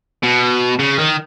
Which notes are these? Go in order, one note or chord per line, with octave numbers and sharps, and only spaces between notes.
B2
C#3
D#3